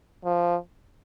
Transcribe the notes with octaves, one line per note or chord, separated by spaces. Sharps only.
F3